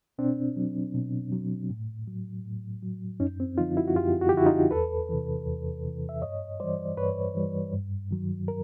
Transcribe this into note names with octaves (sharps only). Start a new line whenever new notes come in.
B2 C4 D4
F#3
B2
F#3
A2
F#3
A2
F#3
F#2 C#4 D#4
C4
D3 F3 D#4 F4
E4 F#4
F#4
F#2 F4 G4
F#4
G4
D3 F3 E4 F#4
D#4 F4
E2 A4 B4
C3 E3
E2
C3 E3
E5
G2 C#5 D#5
E3 G3 C5 D5
G2 B4 C#5
E3 G3
G2
D#3 F#3
A#4